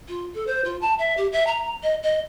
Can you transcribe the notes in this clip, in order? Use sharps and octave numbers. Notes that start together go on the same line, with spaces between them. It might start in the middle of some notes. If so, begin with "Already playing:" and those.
F4
A4
C5
F4
A5
E5
G4
E5
A#5
D#5
D#5